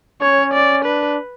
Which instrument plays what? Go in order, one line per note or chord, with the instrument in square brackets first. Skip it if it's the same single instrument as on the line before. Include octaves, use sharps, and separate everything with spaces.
[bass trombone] C#4 [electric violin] C#5
[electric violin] D5
[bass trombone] D4 [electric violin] B4